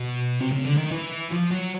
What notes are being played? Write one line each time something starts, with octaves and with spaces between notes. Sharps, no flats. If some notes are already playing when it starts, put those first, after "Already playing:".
Already playing: B2
C3
C#3
D3
D#3
E3
F3
F#3